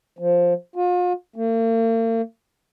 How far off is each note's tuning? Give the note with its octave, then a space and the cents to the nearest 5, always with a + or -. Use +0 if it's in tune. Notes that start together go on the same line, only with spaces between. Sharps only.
F3 +5
F4 +40
A#3 -45